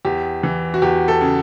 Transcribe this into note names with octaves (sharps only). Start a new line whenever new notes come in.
E2 G4
E3
F#4
E2 G4
A4
C#3